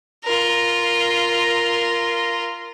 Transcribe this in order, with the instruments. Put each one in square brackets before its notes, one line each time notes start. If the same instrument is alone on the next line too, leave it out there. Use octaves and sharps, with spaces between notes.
[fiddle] F4 A#4